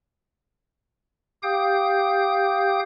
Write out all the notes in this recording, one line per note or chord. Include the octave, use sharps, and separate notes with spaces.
G4 F5 G5 D#6 G6